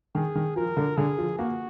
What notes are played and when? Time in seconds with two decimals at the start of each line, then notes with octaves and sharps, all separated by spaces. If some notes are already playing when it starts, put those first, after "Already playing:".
0.15 D#3 G#4
0.35 D#3
0.56 F3 A#4
0.77 D3
0.97 D3 G#4
1.18 F3
1.39 A#3 F#4